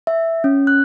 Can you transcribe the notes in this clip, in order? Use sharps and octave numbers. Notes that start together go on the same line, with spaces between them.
E5
C#4
F#6